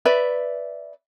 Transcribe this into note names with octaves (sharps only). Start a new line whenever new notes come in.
B4 D5 E5